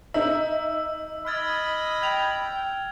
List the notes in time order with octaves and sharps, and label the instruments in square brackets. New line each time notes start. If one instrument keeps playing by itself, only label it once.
[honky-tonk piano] D#4 E5 [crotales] E6
[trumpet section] D#5 B5 [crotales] F6 G#6 A6
[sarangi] G5 [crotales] G#6 F7